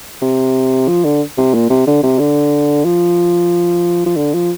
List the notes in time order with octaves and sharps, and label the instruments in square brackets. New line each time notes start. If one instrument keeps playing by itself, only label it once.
[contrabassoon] C3
F3
D3
C3
A#2
C3
D3
C3
D3
F3
F3
D3
F3